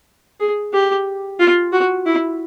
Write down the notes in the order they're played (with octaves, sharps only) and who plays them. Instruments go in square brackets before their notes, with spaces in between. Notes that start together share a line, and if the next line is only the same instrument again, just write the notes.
[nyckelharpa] G#4
G4
F4
F#4
E4